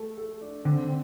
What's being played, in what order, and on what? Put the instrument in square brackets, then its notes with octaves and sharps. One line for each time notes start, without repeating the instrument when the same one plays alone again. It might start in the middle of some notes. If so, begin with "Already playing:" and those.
Already playing: [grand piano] A3 A4
A4
D4
[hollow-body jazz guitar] D3 [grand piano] C4
[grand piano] C4